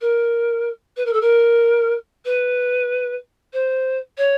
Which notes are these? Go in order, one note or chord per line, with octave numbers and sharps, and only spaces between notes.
A#4
B4
A#4
A4
A#4
B4
C5
C#5